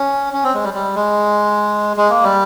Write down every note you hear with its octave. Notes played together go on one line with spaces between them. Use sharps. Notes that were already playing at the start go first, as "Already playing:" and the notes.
Already playing: C#4
C#4
C4
G#3
G3
G3
G#3
G#3
A#3
G3